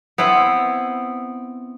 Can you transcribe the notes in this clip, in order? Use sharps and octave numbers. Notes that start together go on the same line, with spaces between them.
B3 C4 E4